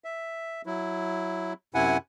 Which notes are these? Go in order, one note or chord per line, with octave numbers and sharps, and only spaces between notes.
E5
F#3 E4
F#2 C3 E4 F#5 G#5